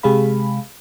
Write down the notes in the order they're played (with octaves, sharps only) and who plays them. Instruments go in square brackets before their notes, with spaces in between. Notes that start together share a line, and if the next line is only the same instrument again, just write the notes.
[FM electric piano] C3 G#3 G4 G#4 F5 B5